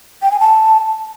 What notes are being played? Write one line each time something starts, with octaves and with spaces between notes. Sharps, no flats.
G5
G#5
A5